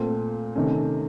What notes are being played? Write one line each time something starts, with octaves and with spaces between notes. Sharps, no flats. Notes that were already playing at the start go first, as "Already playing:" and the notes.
Already playing: A#2 A3 C4
C3 D#3 A3 C#4